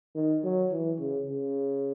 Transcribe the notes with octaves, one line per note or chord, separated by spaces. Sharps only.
D#3
F#3
E3
C#3
C#3